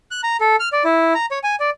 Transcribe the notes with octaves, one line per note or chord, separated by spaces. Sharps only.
F#6
A#5
A4
F6
D5
E4
A#5
C#5
G#5
D5